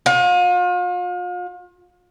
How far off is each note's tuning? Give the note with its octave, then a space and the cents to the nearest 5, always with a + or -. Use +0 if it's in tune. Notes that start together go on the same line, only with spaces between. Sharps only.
F4 +40